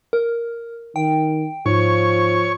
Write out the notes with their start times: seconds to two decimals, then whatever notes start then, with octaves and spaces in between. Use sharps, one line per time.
0.13 A#4
0.96 D#3 G5
1.66 G#2 F3 C#5 C#6